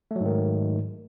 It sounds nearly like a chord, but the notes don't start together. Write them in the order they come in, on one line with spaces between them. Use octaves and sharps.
A3 F#3 G#2 D#3